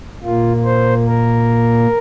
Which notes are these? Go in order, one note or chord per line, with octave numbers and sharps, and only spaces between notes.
A#2 A#3 F4
C5
A#4